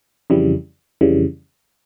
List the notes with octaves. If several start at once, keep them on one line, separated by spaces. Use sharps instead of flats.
F2 C#3 E3 G3
F2 C#3 E3 G3